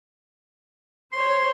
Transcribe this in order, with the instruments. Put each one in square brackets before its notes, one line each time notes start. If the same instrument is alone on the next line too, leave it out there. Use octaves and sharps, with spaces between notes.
[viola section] C5 C#5 [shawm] C6